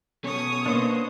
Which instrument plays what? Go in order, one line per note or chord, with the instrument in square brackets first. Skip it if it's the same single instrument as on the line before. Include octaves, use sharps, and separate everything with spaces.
[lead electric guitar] B2 C#4 [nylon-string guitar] A4 [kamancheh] C#5 D#6
[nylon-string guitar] A#3 B3 [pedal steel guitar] D4 C5 D#5